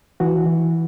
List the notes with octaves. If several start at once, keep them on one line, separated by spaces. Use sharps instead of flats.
E3 F#4
E3